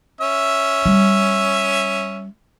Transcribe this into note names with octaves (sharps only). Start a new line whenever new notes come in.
C#4 E5
G3